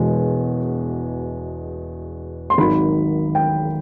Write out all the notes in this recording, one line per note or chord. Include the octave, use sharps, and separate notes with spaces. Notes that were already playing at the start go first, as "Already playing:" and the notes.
Already playing: E1 E2 B2 G#3
C6
G#1 G#2 D#3 F#3 B5
G5